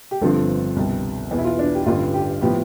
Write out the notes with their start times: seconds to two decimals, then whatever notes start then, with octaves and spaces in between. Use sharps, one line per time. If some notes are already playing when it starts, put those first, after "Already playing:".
0.11 G4
0.21 G1 G2 D3 F3 C4 A4
0.76 C2 B2 G3
1.31 E2 B2 B3
1.39 E4
1.45 F4
1.59 D4
1.75 G4
1.86 A1 G2 D3 G3 F4
2.14 G4
2.41 A2 F3 B3 G4